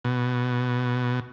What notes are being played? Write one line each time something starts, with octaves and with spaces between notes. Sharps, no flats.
B2